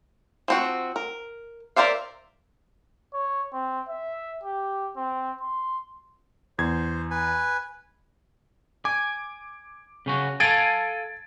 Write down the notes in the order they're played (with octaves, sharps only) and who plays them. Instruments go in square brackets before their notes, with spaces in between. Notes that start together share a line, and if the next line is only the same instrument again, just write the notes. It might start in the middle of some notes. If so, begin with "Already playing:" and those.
[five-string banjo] F3 C4 F#4
A#4
A#4 C5 D5 E5 F5
[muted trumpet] C#5
C4
E5
G4
C4
C6
[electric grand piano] E2 G#6 [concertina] C5
[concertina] B4 G#5
[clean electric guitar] G#5 [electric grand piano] D6
[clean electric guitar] C#3 C#4 F#4
[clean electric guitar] A4 F5 G#5 [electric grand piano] G#6 A6 D7